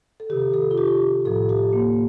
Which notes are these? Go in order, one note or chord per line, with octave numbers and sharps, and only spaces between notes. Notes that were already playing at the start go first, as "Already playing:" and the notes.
A4
C3 D#3 G4
A4
F4
G4
A2 F3 A4
G4
A#3